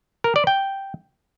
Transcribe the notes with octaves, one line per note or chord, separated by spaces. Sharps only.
A#4
D5
G5